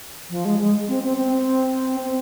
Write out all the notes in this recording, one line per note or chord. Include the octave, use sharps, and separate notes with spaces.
F3
G#3
G#3
C4
C4
C4
C4